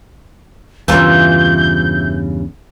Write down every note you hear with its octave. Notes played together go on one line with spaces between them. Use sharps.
E2 G2 C#3 E3 F4 A#4 G6